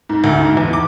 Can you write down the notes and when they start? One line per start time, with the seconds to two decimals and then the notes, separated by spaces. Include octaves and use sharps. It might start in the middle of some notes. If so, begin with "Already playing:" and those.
0.09 G#2
0.24 D2
0.38 G#2
0.57 E2
0.73 D6